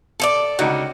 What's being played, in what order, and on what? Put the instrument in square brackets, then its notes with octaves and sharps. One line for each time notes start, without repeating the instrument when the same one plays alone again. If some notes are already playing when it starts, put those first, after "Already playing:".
[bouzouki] A4 C5 D5
[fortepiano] C#2 D#4 F#4 [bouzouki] D3